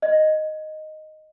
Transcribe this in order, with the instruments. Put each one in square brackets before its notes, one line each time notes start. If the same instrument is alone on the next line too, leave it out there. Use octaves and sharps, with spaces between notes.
[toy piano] D#5